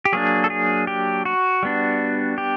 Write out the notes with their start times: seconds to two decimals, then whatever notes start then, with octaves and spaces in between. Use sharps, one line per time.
0.05 G4
0.13 F#3 A#3 D4 G#4
0.44 A4
0.50 G#4
0.87 G4
1.25 F#4
1.63 G3 B3 D4
2.38 G4